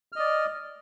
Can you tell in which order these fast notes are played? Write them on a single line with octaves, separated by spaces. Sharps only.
F6 D#5 D5